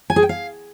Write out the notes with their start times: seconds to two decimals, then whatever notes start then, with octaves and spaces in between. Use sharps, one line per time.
0.10 G#5
0.16 G#4
0.23 G5
0.29 F5